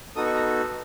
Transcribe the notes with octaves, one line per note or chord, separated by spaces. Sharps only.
B3 D#4 F#4 A4 D#6
C#6
A#5